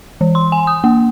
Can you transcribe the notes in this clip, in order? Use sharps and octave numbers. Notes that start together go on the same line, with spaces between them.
E3
C6
G#5
D#6
A#3